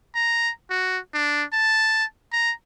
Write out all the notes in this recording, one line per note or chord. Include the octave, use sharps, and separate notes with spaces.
A#5
F#4
D4
A5
A#5